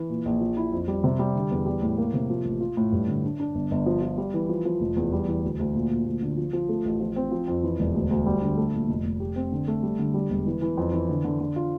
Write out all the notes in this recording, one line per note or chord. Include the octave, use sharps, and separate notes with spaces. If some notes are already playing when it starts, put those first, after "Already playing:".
Already playing: E3
A#2
A#1
F3
E4
F2
G3
C3
G3
D3
E2
G3
A2
A#3
C3
F3
A1
F4
A2
G2
D3
D4
D4
G1
G1
F3
F3
G3
E3
F3
F3
F1
E2
G3
E3
D2
D2
A#2
A#2
D2
D3
F3
F3
A3
A1
F3
C4
F3
F2
E3
E1
D2
D2
G3
D3
A3
A#2
F1
F1
G4
C4
D3
A3
G3
D3
G3
E1
E3
E3
F2
E3
D3
D3
D3
F4